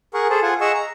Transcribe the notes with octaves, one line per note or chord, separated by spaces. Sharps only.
G#4 A#4 F#5 C#6
G#4 A4 C5
F4 F#5 G#5
G#4 D#5 F#5 C#6 E6
A#5